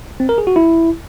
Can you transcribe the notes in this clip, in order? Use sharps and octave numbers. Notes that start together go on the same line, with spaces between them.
C4
A#4
G#4
F#4
E4